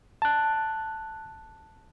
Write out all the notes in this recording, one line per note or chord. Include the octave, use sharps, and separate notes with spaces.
A5 F#6